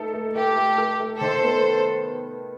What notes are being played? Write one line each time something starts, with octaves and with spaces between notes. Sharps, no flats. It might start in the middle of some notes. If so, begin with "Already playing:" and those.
Already playing: A3 D#4 A4
A3
A3 G4
A3
A4
A3
D#3 A4 C5
B3